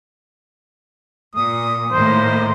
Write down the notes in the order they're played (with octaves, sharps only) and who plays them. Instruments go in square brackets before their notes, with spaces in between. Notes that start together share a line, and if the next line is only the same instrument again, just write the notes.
[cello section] A#2 [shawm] D#6
[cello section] A2 D#3 A#3 [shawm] C5